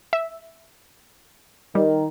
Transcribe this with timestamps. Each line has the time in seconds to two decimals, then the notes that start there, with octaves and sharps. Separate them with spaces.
0.13 E5
1.75 D#3 G3